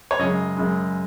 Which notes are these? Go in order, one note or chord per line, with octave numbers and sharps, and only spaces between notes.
C#5
F#2 C#3 G#3 D#5
F#2 C#3 G#3